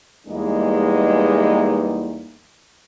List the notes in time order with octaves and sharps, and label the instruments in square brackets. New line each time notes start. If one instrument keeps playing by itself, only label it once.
[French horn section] E2 G3 G#3 A#3 B3 D#4